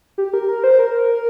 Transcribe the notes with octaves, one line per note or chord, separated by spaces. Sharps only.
G4
A#4
A#4
C5
A#4